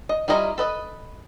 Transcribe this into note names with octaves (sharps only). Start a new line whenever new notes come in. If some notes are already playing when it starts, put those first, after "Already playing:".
D#5
G3 E4 F4 D#5 A#5
A4 B4 D#5